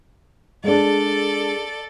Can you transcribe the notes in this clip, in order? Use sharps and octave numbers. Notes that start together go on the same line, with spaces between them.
G#3 D4 A4 D5